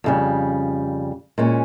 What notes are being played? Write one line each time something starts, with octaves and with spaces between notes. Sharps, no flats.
F2 C#3 G3
A#2 G#3 C#4